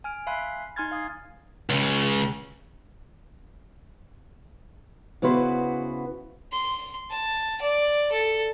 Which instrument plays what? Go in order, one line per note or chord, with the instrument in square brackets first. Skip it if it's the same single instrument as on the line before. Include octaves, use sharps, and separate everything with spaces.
[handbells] G#5 F6 D7
E5 F5 G#5 B5 C6 F#6
D#4 G#5 C6 F6 G#6 A6
F5 D#6 G#6
[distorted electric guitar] C#2 C#3
[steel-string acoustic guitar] C#3 B3 E4 F#4 B4 C5
[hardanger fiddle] C6
A5
D5
A4